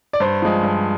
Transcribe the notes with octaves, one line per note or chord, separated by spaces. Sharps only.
D5
G2 C5
F3 G#3
G2